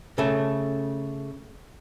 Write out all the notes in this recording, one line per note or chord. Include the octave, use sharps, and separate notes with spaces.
C#3 A3